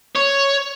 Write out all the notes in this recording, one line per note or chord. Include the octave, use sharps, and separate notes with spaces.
C#5